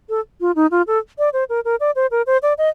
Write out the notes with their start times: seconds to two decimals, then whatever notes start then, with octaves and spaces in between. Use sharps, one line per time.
0.09 A4
0.41 F4
0.56 D#4
0.71 F4
0.87 A4
1.19 D5
1.33 C5
1.49 A#4
1.65 A#4
1.80 D5
1.96 C5
2.11 A#4
2.27 C5
2.43 D5
2.58 D#5